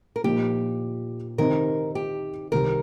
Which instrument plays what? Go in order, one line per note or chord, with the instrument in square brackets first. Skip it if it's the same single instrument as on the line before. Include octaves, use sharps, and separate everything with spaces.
[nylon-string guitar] A#4
[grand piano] A#2 F3 A#3 D#4 [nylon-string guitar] G4
[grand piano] C3 D#3 C4 D#4 [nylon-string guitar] A#4
[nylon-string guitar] G4
[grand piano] C2 C3 D#3 C4 [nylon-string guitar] A#4